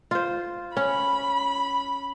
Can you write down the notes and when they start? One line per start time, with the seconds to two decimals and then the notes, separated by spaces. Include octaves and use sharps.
0.11 F4 C5
0.77 C#4 B5